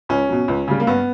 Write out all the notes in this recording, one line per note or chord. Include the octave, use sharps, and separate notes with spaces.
C#2 C#4
B2 F#3
C#2
C#3 G3
A#3
G2 B3